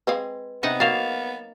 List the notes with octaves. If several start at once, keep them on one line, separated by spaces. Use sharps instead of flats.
G#3 C4 B4 F5
C3 B3 D#4 F#5
F#3 A#3 F5 A6 E7 F7